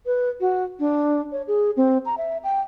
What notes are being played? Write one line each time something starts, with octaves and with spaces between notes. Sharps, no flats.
B4
F#4
D4
C#5
G#4
C4
A#5
E5
G5